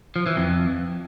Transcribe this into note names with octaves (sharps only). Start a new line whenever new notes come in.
F3
E3
F2